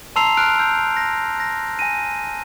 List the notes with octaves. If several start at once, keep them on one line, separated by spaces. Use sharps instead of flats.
A5 A#5 C6 E6 C7 F7
F6 F#6 D7
E6 G6
A#6
A#6
G#5 A#6 D#7